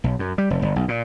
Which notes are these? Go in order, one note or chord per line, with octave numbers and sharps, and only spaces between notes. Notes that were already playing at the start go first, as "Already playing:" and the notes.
B1
F#2
G3
F1
G1
B1
A#2